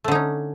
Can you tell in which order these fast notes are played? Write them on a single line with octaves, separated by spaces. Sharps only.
A3 D3 D#4 C#4